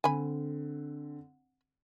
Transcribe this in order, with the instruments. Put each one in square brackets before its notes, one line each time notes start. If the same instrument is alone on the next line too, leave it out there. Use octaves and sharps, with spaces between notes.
[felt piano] D3 C4 [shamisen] G#5 B5